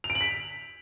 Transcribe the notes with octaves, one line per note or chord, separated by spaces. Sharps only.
F7
D7
F#7
B6